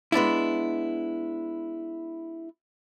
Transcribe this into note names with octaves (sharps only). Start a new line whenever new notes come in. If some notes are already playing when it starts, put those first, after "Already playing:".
G#3 B3 D4 E4